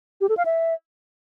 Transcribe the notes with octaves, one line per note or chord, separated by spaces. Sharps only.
G4
A4
F5
E5